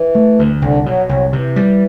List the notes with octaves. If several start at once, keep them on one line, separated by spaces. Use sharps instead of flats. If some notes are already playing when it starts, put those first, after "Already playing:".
Already playing: E3
A3
D2
C2 D3
B2 F#3
C2 F#3
C3 E3
G3